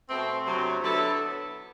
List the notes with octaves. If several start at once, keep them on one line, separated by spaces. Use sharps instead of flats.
B2 A3 C4
D2 C3 F#3
D3 F#3 B3 E4 A4